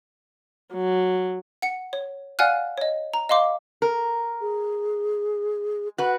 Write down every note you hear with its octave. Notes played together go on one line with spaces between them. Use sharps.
F#3
F#5 C#7
C#5
D5 F5 F#5 G#5 F6 F#6
C#5 D#5
A#5
D#5 F5 C6 D6
A#4
G#4
F#4 B4 F#5